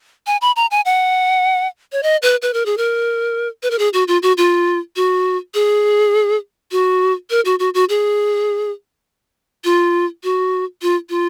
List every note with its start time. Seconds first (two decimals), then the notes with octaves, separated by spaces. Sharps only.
0.27 G#5
0.41 B5
0.56 A#5
0.71 G#5
0.85 F#5
1.92 C#5
2.03 D#5
2.22 B4
2.42 B4
2.54 A#4
2.66 G#4
2.77 A#4
3.63 B4
3.71 A#4
3.79 G#4
3.93 F#4
4.08 F4
4.22 F#4
4.37 F4
4.96 F#4
5.54 G#4
6.72 F#4
7.30 A#4
7.45 F#4
7.59 F#4
7.74 F#4
7.89 G#4
9.64 F4
10.24 F#4
10.82 F4
11.10 F4